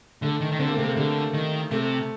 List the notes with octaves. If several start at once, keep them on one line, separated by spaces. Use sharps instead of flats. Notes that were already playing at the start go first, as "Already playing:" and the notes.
D3 A3
D#3
D#3
D3 C4
A#3
A3
C3
A#3
A3
D3 G3
D#3
C3 A3